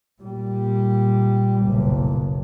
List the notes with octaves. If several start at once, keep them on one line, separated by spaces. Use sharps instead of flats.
A#2 G3
F#1 B1